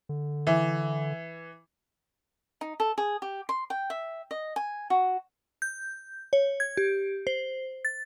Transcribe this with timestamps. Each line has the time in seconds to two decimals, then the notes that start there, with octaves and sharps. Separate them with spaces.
0.09 D3
0.47 E3
2.61 D#4
2.80 A4
2.98 G#4
3.22 G4
3.49 C6
3.70 G5
3.90 E5
4.31 D#5
4.56 G#5
4.90 F#4
5.62 G6
6.33 C#5
6.60 G#6
6.77 G4
7.27 C5
7.85 A6